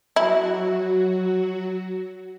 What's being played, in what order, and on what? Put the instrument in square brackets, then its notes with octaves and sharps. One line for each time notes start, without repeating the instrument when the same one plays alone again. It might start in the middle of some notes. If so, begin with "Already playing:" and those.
[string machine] F#3 F#4 [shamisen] E4